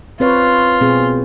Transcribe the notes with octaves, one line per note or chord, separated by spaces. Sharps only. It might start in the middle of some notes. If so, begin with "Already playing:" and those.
C4 F4 B4 C#5
B2 C4 G#4